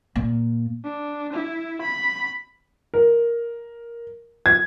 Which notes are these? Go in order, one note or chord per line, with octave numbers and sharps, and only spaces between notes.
A#2
D4
E4
B5
A#4
G#6